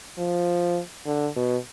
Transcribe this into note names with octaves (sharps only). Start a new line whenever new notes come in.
F3
D3
B2